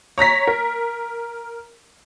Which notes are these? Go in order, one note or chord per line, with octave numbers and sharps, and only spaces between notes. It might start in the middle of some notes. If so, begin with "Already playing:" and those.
C#5 A#5 A#6 B6
A#4